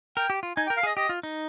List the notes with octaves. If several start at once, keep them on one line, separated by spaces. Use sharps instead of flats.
A#4 G5
G4
F4
D#4 G#5
G5
A#4
F5
G#4 D#5
G4 D#5
F4
D#4